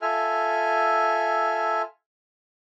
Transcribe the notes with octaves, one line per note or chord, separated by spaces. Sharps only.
F4 A4 E5 G#5 F6